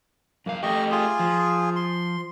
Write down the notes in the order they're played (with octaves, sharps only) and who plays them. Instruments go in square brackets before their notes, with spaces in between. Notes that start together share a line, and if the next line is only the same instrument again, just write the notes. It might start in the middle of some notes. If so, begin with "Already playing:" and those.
[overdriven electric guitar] F#2 F5 [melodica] A#3
[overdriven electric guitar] A3 G4 [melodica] D#5 C#6
[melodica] F4 G#4
[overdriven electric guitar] F3
[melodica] C6